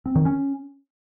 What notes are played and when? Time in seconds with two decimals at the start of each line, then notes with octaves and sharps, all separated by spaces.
0.06 C4
0.15 D#3
0.25 C#4